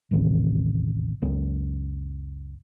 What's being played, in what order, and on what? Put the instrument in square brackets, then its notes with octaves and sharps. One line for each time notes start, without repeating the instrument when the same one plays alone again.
[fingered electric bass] E1 A1 D#2 C3
F#1 C#2 B3 C#4